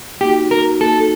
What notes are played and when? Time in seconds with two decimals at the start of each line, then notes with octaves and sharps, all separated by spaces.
0.21 A#3 D#4 F#4 G4
0.51 A#4
0.80 A#3 D#4 F#4 A4